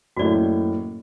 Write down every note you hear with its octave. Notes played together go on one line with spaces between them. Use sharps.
F#1 A2 F#4 D5